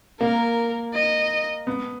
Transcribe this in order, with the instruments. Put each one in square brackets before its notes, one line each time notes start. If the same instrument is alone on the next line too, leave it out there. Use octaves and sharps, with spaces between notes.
[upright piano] A#3 [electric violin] A#4
[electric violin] D#5
[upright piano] B3